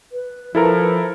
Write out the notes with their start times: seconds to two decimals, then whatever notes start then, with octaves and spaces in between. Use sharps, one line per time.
0.11 B4
0.55 F3 E4 A4 A#4